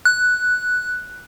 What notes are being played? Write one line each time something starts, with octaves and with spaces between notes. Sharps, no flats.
F#6